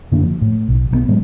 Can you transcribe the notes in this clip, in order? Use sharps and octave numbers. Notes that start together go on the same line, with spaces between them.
F#2 D3 A#3 D4
F3
A2
B1
B1 F3 B3
A2 F#3 G#3